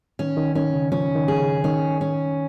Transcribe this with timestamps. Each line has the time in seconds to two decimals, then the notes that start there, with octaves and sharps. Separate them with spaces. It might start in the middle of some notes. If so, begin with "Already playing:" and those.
0.19 D#3 C#4
0.37 D#3
0.55 D#3 C#4
0.74 C#3
0.92 F3 C#4
1.15 D#3
1.28 G#4
1.40 C#3
1.64 D#3 C#4
2.01 C#4